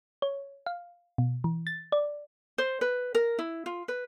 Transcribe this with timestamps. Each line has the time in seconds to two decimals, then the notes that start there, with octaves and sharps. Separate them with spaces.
0.22 C#5
0.66 F5
1.18 B2
1.44 E3
1.67 A6
1.92 D5
2.58 C5
2.81 B4
3.15 A#4
3.39 E4
3.66 F4
3.88 B4